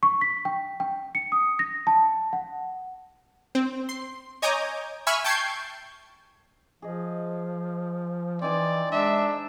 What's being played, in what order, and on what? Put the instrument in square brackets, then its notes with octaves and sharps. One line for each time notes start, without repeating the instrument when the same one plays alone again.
[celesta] C#6
B6
G5
G5
C#7
D#6
A#6
A5
F#5
[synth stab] C4
C6
C#5 D#5 G#5 A#5 D6 G6
E5 G#5 B5 C#6 E6 F6
G5 A5 C#6 G6 G#6 C7
[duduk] F3 [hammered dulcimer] G#4 D#5
[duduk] E3 [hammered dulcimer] C4 D#4 G#5 [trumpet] D5
[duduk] G#3 [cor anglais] D4 [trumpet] E5